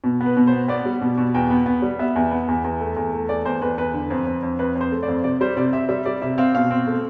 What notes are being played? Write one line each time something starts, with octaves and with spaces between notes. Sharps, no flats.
B2
B3
B4
B2
C5
B3
B3 D5
G3
B2
B2
E2 G5
B3
B3
G3
B3 E5
E2
B3
E2
E2
A3
E2
A3
E2 D5
E2 C5
E2 B4
E2 B4
D3
F2
F2
F2
F2 B4
F2
C5
A3
D5
F2
C3 D5
G3 C5
C3 D5
C4 E5
G3 E5
G3 D5
C3 E5
C4 F5
B2 F5
C4
A3